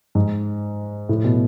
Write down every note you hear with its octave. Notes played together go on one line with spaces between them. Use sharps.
G#2
A2
B2